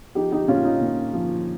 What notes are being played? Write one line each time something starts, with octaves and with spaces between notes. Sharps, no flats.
F3 D#4 G4
D#4 G4
A#2 C#4 F4
D#4
A#2
F3